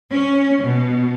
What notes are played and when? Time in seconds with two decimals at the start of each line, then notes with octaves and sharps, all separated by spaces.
0.12 C#4
0.63 B2